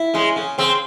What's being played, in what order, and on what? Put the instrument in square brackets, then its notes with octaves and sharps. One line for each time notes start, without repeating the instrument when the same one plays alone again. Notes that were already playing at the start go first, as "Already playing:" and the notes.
Already playing: [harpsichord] E4
[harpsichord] C#3 [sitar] G#3
[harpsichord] C#3
[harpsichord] C#3 [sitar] C4